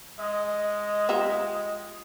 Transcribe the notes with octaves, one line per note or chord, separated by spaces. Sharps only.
G#3 D#5
F4 G4 E5